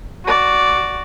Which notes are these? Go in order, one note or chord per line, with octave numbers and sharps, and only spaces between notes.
F#4 D5